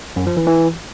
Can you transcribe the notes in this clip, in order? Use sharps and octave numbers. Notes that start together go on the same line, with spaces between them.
F#2
F3
E3
E3